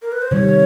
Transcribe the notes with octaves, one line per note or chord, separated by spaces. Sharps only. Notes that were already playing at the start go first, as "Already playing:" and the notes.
A#4
B4
C5
C3 D#3 G3 C#5